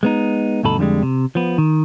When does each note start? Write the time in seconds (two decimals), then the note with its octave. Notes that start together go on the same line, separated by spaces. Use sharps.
0.03 G#3 B3 D#4
0.63 D2 G2 B2 D#4 A4 B5
0.78 F2 D3 F3 G3 G#3
1.03 C3
1.35 F3 B3
1.58 D#3